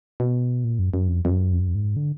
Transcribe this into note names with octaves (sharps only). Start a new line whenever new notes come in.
B2
A#2
F#2
F#2
F2
F2
F#2
F2
F#2
F2
G#2
D3